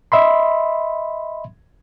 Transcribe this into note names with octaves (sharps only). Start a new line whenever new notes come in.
D#5 E5 B5 C6